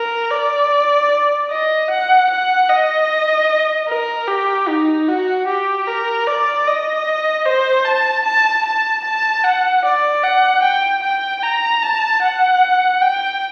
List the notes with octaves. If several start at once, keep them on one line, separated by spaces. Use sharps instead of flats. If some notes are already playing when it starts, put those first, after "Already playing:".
Already playing: A#4
D5
D#5
F#5
F#5
D#5
A#4
G4
D#4
F#4
G4
A#4
D5
D#5
C5
A5
A5
A5
A5
F#5
D5
F#5
G5
G5
A#5
A5
F#5
G5